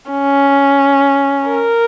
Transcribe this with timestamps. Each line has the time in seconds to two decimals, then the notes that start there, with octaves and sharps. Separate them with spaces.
0.11 C#4
1.48 A#4